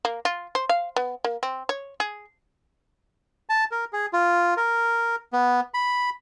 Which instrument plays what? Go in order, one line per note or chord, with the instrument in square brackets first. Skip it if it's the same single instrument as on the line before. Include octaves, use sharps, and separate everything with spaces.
[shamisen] A#3
F4
C5
F5
B3
A#3
C4
C#5
G#4
[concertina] A5
A#4
G#4
F4
A#4
B3
B5